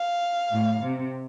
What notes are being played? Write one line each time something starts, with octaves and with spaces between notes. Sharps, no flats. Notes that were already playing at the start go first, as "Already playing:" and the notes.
Already playing: F5
A2
C3